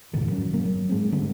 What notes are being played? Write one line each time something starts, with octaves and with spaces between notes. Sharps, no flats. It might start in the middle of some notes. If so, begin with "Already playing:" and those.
F2 G#2 B2 D#3
F3 F#3 C#4
G1 A#3
F#3
G#2 G#3 C4
D3 G3 A#3 C4